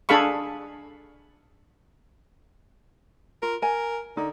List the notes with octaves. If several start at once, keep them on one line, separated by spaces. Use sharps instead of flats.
D4 G#4 A4 F5 B5 C#6
F4 A#4
A#4 G#5
D3 D#4